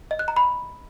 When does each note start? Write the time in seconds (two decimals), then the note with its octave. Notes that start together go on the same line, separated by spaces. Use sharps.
0.11 D#5
0.19 F#6
0.28 A#5
0.36 B5